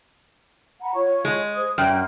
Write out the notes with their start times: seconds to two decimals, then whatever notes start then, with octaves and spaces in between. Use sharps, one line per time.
0.81 F#5 A#5 B5
0.94 F4 C#5 C#6
1.25 G#3
1.55 C5 D#6
1.78 F#2 D5 G5 F6